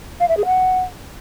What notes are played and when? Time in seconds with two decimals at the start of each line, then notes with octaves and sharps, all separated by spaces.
0.20 F5
0.29 E5
0.37 G#4
0.46 F#5